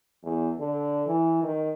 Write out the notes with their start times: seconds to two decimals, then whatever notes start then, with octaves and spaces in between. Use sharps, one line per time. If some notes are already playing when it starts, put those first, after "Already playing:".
0.23 E2
0.59 D3
1.07 E3
1.43 D#3